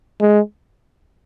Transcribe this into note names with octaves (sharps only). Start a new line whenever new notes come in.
G#3